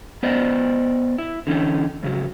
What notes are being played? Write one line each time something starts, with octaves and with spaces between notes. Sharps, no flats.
B3 C5 D5 D#5
E4
D3 E3 C#4 D#4
G#2 C#3 F#3